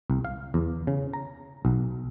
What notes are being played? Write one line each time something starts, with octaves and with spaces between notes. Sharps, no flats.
C2
F5
E2
C#3
A#5
B1